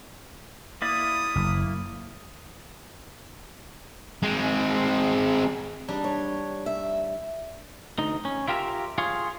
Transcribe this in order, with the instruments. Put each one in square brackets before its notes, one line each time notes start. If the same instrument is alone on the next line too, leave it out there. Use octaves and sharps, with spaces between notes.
[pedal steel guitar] A#3 E4 D5 [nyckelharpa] D#6
[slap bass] F#1
[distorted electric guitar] G#3 C4
[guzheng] G3 D4 D#4
[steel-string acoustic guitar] C#5
E5
[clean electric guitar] D2 D#4
C#4
E4 F4 G4 A#4 E5
F4 G#4 C#5